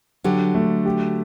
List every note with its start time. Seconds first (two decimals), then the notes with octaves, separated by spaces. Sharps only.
0.24 D3 F#3 G4
0.54 A3
0.85 G4